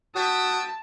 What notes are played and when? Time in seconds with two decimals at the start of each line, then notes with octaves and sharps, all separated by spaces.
0.16 F#4 E5 G5 A5 D#6